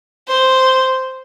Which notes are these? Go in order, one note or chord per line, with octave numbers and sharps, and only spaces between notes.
C5